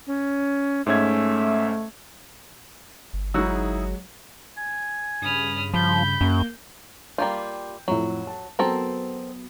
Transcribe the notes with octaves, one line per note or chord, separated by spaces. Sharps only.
C#4
G#2 A3 C#4 E5 G#6
G1
F#3 G#3 D#4 E4 F#4 G#4 E6
G#5
G2 C#3 B5 D#6 F6
F3 B5 G6
F#2 A#3
G3 A#3 F4 G5 G6
F2 A2 F#3 E4
A5
F#3 B3 C4 A4 A#4